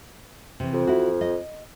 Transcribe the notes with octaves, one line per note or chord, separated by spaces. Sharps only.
C3 E3
F2
E4 F#4
D#5